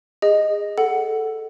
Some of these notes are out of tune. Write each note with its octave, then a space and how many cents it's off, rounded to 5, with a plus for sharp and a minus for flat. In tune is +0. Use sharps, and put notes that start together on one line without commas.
G#4 -20 D#5 +0
A4 +0 F#5 +5